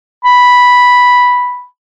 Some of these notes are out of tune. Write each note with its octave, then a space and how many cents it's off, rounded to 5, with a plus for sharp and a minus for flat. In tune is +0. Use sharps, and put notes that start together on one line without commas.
B5 -5